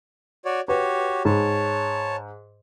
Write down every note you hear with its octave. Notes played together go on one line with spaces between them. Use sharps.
F#4 C#5 D5
F#4 G4 B4 C#5
G#2 C#5 A5